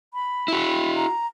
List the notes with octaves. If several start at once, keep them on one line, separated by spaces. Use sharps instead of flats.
B5
E4 F#4
A#5